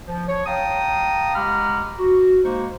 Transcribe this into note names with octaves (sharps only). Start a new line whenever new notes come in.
F3
C#5
F5 G5 A5 A#5 D#6
G#3 G4 F#5 A#5 B5 F6
F#4
G#3 A#3 D#4 C5 C#6